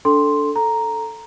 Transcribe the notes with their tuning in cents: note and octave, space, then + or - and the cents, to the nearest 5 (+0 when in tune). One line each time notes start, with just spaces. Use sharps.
D4 -15 A4 +0 C6 +0
A4 +0 A#5 +0